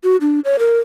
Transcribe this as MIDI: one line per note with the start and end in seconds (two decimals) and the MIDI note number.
0.04 0.16 66
0.21 0.40 62
0.45 0.56 73
0.59 0.78 70